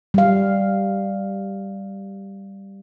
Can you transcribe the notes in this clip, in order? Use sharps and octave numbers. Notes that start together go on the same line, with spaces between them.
G3 F5